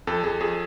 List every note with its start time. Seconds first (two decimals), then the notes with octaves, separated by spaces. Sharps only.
0.07 F2 A4
0.23 F2 G#4
0.40 F2 G#4